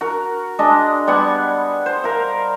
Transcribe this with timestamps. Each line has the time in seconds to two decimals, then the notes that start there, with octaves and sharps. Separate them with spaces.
0.01 F#4 A#4
0.59 G#3 D4 D#5
1.07 G3 B3 F#5 G#5
1.86 C5
2.04 A#4 F5